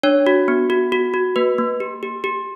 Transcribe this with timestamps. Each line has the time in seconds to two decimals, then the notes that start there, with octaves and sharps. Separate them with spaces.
0.03 D4 C#5
0.27 F#4
0.48 B3
0.70 F#4
0.92 F#4
1.14 F#4
1.36 A#3 B4
1.58 A#3
1.80 G4
2.03 G4
2.24 G4